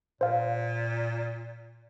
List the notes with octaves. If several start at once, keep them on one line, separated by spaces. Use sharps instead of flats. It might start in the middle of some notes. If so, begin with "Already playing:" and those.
A#2 C5 F5